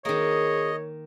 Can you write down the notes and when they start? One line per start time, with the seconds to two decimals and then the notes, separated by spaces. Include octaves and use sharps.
0.05 D#3 A#3 G#4 C#5 D#5